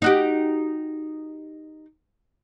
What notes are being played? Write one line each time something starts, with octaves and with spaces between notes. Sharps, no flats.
D#4 F#4 G4